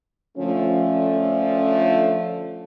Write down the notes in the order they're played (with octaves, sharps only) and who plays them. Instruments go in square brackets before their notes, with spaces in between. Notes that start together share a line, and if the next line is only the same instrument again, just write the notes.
[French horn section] D3 F3 A3 [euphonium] C#4